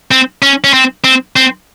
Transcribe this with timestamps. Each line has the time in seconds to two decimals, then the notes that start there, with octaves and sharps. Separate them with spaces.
0.11 C4
0.42 C#4
0.64 C#4
0.73 C4
1.04 C4
1.36 C4